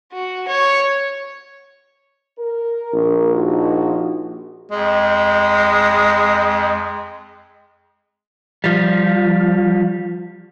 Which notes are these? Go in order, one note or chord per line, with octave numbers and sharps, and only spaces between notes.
F#4
C#5
A#4
A#1
D#4 F#4
F2 G#3
F3 G3